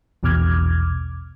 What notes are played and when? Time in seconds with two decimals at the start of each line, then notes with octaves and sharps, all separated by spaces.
0.23 A#1 E2 B2 D6 F6 G#6